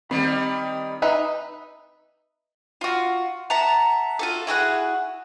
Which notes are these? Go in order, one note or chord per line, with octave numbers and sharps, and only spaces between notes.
D#3 G3 C4 B5
D#4 B4 E5
F4 F#4
E5 F#5 A5 A#5
F4 F#4 A4
E4 F#4 G#4 F#5